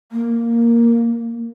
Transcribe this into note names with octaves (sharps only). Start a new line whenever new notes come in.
A#3